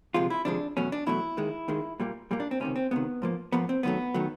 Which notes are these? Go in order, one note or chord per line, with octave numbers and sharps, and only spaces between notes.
D2 C3 F3 G#3 F4
E4
D2 C3 F3 G#3 D4
E2 B2 F#3 A3 C#4
D4
E2 B2 F#3 A3 E4
D#2 D#3 G#3
D#2 D#3 G#3
A#2 G3 A#3
A#2 G3 A#3
D4
C4
C#2 C3 D#3 C#4
C4
C#2 C3 D#3 B3
G#2 F3 A#3
G#2 F3 A#3 B3
C4
F#2 D#3 F#3 A3 B3
D#3 F#3 A3